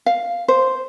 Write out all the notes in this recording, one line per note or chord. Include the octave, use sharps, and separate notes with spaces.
F5
C5